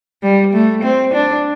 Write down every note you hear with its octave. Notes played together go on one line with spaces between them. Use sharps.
G3
A3
C4
D4